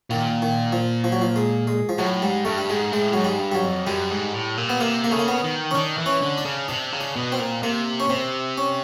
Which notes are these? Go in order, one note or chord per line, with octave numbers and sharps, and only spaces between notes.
A#2 D#3
D#3
F3
F3
F#3
F3
G#3
G#3
F3
A2 F#3
G#2 G3
G2 A3
G3
G#2 G#3
A2 G#3
G#2 F#3
G3
G2
G3
F#3
F2
F#2 G3
G#2
A2
A#2
B3
C3 A#3
A#3
C#3 A3
A#3
B3
D#3
C#4
D#3 D4
E3
C#4
D3
D4
C#3
C3 D4
C#3
D4
B2
C4
A#2
C3 A#3
C#4
C3 C4
C#4